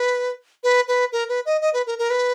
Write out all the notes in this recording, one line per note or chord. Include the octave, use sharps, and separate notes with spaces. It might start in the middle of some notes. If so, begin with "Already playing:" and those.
Already playing: B4
B4
B4
A#4
B4
D#5
D#5
B4
A#4
A#4
B4